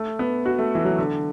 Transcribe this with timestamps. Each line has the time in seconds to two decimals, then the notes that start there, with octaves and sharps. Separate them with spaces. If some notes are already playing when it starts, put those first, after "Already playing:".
Already playing: A3
0.19 B3
0.46 F#4
0.58 A3
0.75 E3
0.85 F#3
0.99 D3